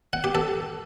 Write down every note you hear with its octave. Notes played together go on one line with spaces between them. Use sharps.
F#5
G4
A4